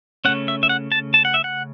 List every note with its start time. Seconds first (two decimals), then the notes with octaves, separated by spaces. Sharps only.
0.25 C#3 A3 C#4 F#5
0.48 E5
0.63 E5
0.69 F#5
0.92 A5
1.14 A5
1.25 F#5
1.34 E5
1.44 F#5